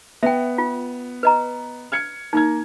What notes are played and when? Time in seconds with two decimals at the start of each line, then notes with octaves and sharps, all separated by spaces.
0.23 B3 E5 G5
0.58 F4
1.23 B4 D#5 A#5
1.92 F6 G#6 C#7
2.33 A#3 D#4 A#5 G#6